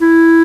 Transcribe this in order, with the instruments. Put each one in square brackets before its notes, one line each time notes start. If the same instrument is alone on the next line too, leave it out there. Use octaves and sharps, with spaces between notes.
[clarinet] E4